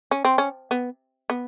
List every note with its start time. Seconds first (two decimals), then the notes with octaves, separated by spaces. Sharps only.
0.11 C#4
0.25 C4
0.38 C#4
0.71 B3
1.30 B3